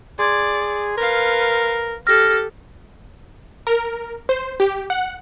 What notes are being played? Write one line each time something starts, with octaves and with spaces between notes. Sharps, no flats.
G#4 D5 C6 G#6
A#4 B4 F5
G4 A4 F6 A#6
A#4
C5
G4
F#5